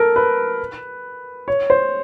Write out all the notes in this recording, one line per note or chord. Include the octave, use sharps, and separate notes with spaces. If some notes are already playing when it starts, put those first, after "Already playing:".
Already playing: A4 A#4
B4
C#5
C5